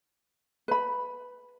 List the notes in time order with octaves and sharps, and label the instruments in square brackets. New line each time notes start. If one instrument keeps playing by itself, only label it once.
[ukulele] B4 B5